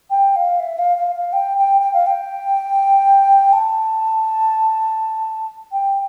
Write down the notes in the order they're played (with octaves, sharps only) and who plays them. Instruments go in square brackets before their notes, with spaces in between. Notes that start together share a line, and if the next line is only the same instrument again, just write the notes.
[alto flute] G5
F5
E5
F5
F5
F5
G5
G5
G5
F5
G5
A5
G5